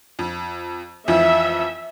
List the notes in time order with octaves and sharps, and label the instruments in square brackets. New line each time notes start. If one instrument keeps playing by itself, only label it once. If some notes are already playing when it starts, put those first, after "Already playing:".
[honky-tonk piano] F2
[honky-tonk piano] F2 E3 F3 [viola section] E5